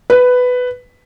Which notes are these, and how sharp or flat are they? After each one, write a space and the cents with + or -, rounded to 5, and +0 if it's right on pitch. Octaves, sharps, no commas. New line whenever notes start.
B4 +10